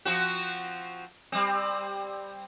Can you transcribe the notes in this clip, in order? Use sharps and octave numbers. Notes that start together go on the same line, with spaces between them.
F3 C4 F#4
G3 C4